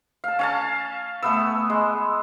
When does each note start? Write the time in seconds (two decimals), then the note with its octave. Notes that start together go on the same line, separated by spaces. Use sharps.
0.24 F5 A5
0.39 C#4 F5 A5
1.22 A3 B3 E6
1.70 G#3